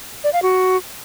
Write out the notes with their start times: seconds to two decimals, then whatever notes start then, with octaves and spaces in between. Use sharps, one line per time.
0.24 D5
0.33 F5
0.42 F#4